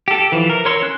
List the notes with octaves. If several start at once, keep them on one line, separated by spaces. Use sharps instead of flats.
G4 A4
E3 F3
A#4
A#4 C#5 C6 E6
C#4 F#6